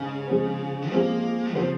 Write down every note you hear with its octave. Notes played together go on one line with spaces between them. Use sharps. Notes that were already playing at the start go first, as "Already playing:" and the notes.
Already playing: G#2 C#3 C#4
F3 G#3 C4
F3 G#3 A#3 C4
C#3 F3 C4 F#4 C5